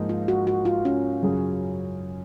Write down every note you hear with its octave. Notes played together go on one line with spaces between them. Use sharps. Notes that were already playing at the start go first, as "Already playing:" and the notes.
Already playing: G#2 F3 A#3 D#4
F4
F#4
F#4
F4
C#4
F#2 C#3 F#3 C#4 G#4